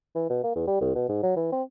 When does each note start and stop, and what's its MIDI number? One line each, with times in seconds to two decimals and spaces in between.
0.15 0.25 52
0.30 0.40 47
0.44 0.52 58
0.56 0.63 40
0.67 0.81 55
0.81 0.91 36
0.95 1.06 47
1.09 1.21 44
1.23 1.34 54
1.36 1.51 52
1.52 1.62 60